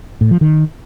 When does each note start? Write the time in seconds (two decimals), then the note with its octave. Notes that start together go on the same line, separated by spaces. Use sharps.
0.21 A2
0.31 F3
0.41 D#3